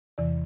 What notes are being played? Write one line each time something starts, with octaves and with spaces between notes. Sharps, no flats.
E2 C3 E3 D5